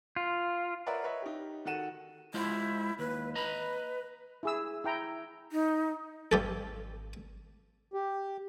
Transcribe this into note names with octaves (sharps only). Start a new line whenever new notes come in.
F4
A#4 B4 C#5 D5 E5 F#5
B4 C#5 D#5 E5
D#4 G4
D#3 F#4 A4 F#5 D#7 E7
G#3 E4 F4 C5
D#2 B4
B4 D#5 A#5 B5
E4 G#4 E6
E4 G5 A#5
D#4
G#1 G2 G4 A4
G4